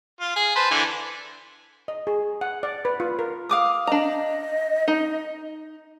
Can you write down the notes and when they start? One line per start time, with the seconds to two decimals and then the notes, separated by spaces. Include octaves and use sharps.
0.20 F4
0.36 G#4
0.56 B4 C5 A5
0.71 D3 E3 G#5
1.88 D#5
2.07 G#4
2.41 F#5
2.63 D5
2.85 B4
3.00 F4
3.19 A#4
3.49 F5 D6 D#6
3.87 D4 D#5 A#5
4.88 D#4